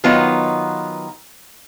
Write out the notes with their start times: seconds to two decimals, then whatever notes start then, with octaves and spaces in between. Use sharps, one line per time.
0.04 D#3 F#3 B3 D#4 F4 B4